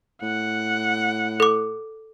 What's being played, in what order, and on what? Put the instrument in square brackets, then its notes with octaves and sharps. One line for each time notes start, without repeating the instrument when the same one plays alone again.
[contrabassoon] A2 [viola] F#5
[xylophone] A4 D6